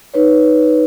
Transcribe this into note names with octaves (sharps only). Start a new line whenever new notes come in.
D#4 B4 C#5